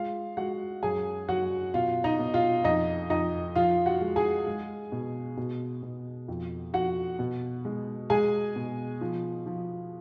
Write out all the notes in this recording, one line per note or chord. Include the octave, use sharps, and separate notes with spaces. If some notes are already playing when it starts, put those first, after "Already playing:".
Already playing: G#3 F4 F5
G#3 F#4 F#5
F#2 G#4 G#5
F#2 F#4 F#5
B2 F4 F5
D#4 D#5
B2
F4 F5
F2 D#4 D#5
F2 D#4 D#5
F3 F4 F5
F#4 F#5
G#3
G#4 G#5
G#3
B2
B2
B2
F2
F2 F#4 F#5
B2
G#3
G#3 G#4 G#5
B2
F3
F3